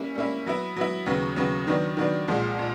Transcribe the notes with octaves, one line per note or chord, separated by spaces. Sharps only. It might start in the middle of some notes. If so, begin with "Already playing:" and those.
Already playing: G3 A#3 C#4 E4
G3 A#3 C#4 E4
F#3 B3 E4
F#3 B3 E4
D#2 C#3 F#3 B3
D#2 C#3 F#3 B3
D#3 F#3 B3 D4
D#3 F#3 B3 D4
C2 A#2 F3 G#3
A#2